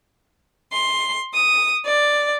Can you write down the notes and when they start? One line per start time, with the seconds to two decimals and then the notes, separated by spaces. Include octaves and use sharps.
0.72 C6
1.32 D#6
1.85 D5